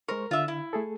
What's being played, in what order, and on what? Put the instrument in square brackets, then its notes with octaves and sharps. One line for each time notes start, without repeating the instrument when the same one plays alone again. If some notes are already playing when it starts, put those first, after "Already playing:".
[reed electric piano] G#3 C5 C#6 [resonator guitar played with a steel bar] A#4
[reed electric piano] D3 [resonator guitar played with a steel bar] F4 E5
[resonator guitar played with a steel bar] E4
[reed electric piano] A3 G#4 A4